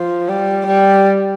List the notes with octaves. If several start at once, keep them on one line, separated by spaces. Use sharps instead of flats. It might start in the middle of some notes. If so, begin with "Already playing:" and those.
Already playing: F3
G3
G3